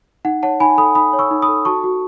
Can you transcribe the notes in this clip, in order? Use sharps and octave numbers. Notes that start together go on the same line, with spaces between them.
D#4 F#5
C#5 F#5 A5
D#4 G#5 B5
A4 B5 D#6
D#4 B5 D#6
C#5
C#6 E6
D#4
B5 D#6
A4
F#4 A5 C#6
F#4